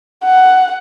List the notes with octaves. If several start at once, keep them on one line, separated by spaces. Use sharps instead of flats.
F#5